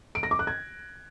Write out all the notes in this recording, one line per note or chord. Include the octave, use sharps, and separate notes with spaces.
D7
A#6
D6
F#6
G#6